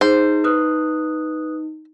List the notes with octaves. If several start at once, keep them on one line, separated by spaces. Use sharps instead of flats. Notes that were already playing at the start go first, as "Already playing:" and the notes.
D#4 G#4 C5
B4 D#6 F#6